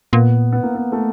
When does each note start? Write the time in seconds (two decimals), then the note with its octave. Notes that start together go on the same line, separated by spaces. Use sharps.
0.13 A#2 B3
0.52 B3
0.63 A#3
0.75 B3
0.92 A3